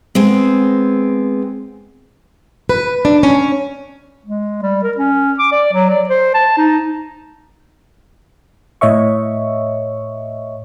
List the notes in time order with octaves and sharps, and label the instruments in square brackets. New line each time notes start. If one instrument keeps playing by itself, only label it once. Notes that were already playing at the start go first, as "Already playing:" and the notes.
[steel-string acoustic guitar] G#3 B3 C4
B4
D4
C#4
[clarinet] G#3
G3
A#4
C#4
D6
D5
F#3
D5
C5
A5
D#4
[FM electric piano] A2 C#5 D#5 E5 C#6